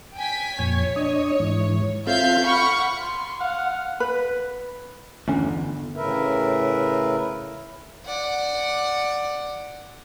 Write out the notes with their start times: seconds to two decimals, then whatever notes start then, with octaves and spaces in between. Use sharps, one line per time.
0.17 G5 G#5 B6
0.59 F2 A#2 C#5 G#6
0.96 D4 D#5
1.40 G#2 E3
2.07 C4 F4 A4 E5 F5 G6
2.44 F5 F#5 B5 C#6
3.01 C6
3.40 F5 F#5
4.00 B4
5.28 G1 E2 D3 A3 C#4
5.96 A2 C#3 A#4 B4 E5
8.06 D5 F#5